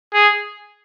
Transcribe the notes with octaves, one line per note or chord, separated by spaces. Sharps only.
G#4